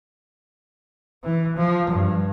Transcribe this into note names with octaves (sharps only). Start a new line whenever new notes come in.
E3
F3
G2